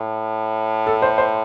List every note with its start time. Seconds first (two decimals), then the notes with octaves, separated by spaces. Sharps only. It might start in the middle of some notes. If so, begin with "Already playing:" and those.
Already playing: A2
0.87 A4
1.02 C5
1.18 C5